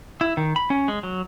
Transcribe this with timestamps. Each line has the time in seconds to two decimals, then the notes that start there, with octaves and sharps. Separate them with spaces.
0.21 E4
0.37 D#3
0.56 B5
0.70 C#4
0.88 G#3
1.03 F#3